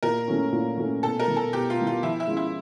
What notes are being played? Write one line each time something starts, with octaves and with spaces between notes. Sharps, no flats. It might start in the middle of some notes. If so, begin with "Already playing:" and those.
A#2 A#4
F#3 A3 C#4
A#2
F#3 A3 C#4
B2 A4
A#4
G3 B3
A4
B2 G4
F4
G3 B3
F4
F3 E4
E4
G#3 C#4 F4
E4